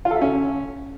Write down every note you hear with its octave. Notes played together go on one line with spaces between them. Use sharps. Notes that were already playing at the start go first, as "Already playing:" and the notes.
F4
A4
E5
C#4